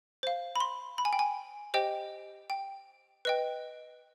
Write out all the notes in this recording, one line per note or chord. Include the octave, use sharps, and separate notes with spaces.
C5 F5
B5
C6
B5
G#5
G5
G#5
G4 C5 D#5 G5
G5
B4 D#5 G5